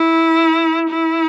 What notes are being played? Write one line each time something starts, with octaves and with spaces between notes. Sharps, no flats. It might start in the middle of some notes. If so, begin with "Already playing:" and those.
Already playing: E4
E4